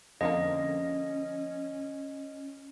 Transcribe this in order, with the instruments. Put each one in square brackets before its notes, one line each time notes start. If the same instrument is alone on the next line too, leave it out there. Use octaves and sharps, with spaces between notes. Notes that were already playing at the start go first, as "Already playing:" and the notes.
[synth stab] F2 D3 A#3 [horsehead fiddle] C#4 [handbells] D#5